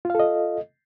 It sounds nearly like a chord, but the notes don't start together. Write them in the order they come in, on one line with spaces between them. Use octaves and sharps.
F4 F5 A4 D#5